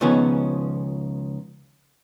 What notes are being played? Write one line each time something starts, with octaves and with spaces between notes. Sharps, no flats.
C#2 D#3 F3 B3 C#4 G#4